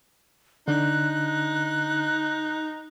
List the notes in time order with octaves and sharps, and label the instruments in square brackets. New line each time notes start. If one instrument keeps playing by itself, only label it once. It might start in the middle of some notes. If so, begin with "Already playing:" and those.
[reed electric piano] D3 D4 [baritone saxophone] D#4 [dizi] F#6